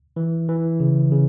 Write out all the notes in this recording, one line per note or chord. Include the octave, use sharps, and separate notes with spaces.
E3
E3
C#3
C#3